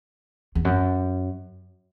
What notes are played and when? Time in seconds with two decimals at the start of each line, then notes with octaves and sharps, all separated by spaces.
0.55 E2
0.65 F#2